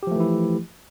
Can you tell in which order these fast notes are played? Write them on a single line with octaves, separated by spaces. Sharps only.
G4 F3 A3 E3 E4